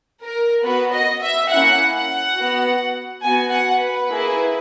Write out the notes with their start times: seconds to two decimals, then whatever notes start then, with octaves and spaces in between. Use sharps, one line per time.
0.21 A#4
0.63 B3 F#4 B4
0.93 D#5
1.21 E5
1.50 A#3 C#4 E4 F#5
1.93 F#5
2.36 B3 F#4
3.22 B3 F#4 G#5
3.50 F#5
3.79 B4
4.08 A#3 E4 G#4